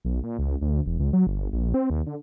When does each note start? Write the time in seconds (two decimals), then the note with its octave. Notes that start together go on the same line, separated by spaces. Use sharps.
0.05 B1
0.23 A#2
0.39 C#2
0.61 D2
0.86 E1
1.00 C#2
1.13 F#3
1.27 G1
1.53 A#1
1.74 C4
1.90 D#2
2.07 D3